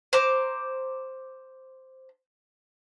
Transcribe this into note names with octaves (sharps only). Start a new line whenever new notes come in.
C5 A#5 D6